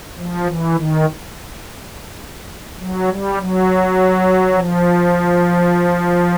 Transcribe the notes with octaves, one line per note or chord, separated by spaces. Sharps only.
F3
E3
D#3
F#3
G3
F#3
F3